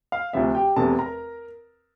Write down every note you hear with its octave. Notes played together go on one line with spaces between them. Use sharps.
F5
D2 C3 F3 E5
G4 G5
F1 E2 C3 A4 A5
A#4 A#5